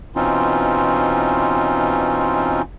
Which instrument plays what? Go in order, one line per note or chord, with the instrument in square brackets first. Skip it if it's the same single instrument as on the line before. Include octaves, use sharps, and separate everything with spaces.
[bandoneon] B2 E3 C4 C#4 D#4 F4